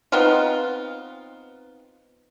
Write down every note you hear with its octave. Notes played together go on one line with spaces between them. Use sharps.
B3 C4 D#4 F4